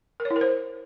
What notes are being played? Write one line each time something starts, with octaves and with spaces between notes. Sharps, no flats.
A#4
C#5
E4
A#4
C5